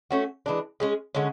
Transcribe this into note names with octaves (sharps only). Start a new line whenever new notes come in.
A3 C#4 F#4
E3 G#3 D4
G#3 C#4 G#4
D3 G#3 C#4